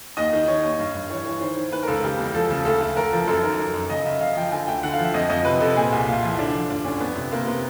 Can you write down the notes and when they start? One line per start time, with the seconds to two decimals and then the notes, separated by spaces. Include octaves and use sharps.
0.17 D#2 D#5
0.33 D#3
0.47 D#3 C#5
0.63 D#2
0.79 G2
0.94 G2
1.10 E3 C#5
1.25 E3 C#5
1.41 D#3 C5
1.57 D#3
1.72 D#3 B4
1.83 A#4
1.87 C#2 A4
2.03 C#3 G4
2.18 E2
2.34 F3 A4
2.50 C#3 A4
2.65 D2 A4
2.81 D2
2.96 D2 A#4
3.13 F3
3.27 F#2 A4
3.43 D#3 A#4
3.59 F#2
3.74 F#2
3.90 C#3 D#5
4.05 C#3 E5
4.21 C#3 F5
4.37 F3 G5
4.52 D3 G#5
4.67 D2 G5
4.83 D3 F#5
4.93 F5
4.98 F3
5.04 E5
5.14 F2 D#5
5.29 F2 D#5
5.45 C3 B4
5.61 C3 A4
5.76 A#2 G#4
5.92 C2
6.07 A#2 F4
6.23 F3 E4
6.38 D3 D4
6.54 F3
6.69 G2 D4
6.85 D3 C#4
7.00 F2 B3
7.16 C3
7.32 C3 A#3
7.47 C3 B3